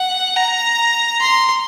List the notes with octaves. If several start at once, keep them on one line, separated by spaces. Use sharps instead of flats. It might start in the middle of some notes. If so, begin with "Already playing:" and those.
Already playing: F#5
A#5
C6